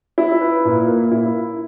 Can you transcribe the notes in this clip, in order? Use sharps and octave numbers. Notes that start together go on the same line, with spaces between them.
E4
B4
A#2
A#3
E4